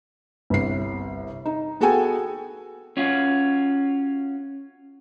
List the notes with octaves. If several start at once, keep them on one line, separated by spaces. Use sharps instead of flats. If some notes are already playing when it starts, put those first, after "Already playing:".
G1 C2 C7
D#4
B3 F#4 G#4 A4 G5 G#5
C#4 F4 F#4